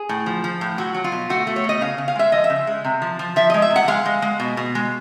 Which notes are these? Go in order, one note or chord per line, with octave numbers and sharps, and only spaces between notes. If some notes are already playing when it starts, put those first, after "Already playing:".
Already playing: G#4
A2
F3
F3
A2
F#3 F#4
F#3
F4
B2
A3 F#4
A3
C#5
B2 D#5
C#3 F5
C#3
F5
G#3 E5
F3 D#5
E5
C#3
G#3
C3
F3
F3
F3 E5
G#3 D#5
E5
C3
F#5
G#3 F5
G#3
G#3
B2
B2
G#3